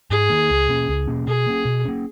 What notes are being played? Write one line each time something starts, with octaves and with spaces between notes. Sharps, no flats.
G#2 G#4
D#3 A#3
C#2
B2 A#3 C#4
C#2
B2 A#3 C#4
B2 G#4
A#3 C#4
B2
A#3 C#4